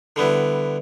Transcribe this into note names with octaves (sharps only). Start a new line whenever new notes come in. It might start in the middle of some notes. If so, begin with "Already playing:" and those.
D3 G3 B3 E4